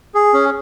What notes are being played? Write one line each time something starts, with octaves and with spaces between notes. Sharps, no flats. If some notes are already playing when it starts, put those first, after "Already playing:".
G#4
C#4